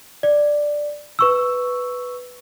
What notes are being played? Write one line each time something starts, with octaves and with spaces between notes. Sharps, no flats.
D5
B4 C#6 E6